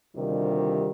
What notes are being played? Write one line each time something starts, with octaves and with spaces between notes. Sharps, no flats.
D2 C3 D#3 G3 D#4 F4